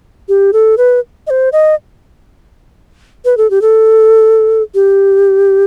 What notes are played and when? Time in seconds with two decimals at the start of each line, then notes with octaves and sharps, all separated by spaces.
0.29 G4
0.53 A4
0.78 B4
1.27 D#5
1.30 C5
1.52 D#5
3.25 B4
3.37 A4
3.50 G4
3.62 A4
4.75 G4